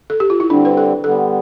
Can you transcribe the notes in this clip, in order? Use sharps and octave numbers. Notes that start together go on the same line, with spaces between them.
A4
G4
F4
E4
D3 G3 C4 D4
B4
A4
D3 G3 B3 A4